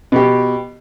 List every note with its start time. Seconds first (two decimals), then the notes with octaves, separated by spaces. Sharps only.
0.12 B2 G4